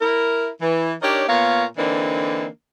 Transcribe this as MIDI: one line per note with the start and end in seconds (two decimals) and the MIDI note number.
0.01 0.49 64
0.01 0.49 70
0.60 0.93 52
1.02 1.23 62
1.02 1.23 63
1.02 1.23 67
1.02 1.23 70
1.02 1.23 73
1.28 1.65 46
1.28 1.65 59
1.28 1.65 70
1.28 1.65 73
1.28 1.65 77
1.77 2.47 50
1.77 2.47 52
1.77 2.47 58
1.77 2.47 60
1.77 2.47 62
1.77 2.47 63